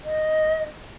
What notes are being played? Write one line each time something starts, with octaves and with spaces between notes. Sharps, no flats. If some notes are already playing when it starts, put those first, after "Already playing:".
D#5